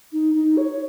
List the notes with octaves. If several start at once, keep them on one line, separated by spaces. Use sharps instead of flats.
D#4
D#4
C#5